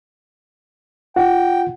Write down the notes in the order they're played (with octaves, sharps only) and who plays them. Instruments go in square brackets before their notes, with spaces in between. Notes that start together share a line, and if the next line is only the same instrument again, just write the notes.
[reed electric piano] F4 F#5 [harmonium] G5